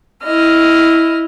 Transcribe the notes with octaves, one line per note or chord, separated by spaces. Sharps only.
E4 D#5 F6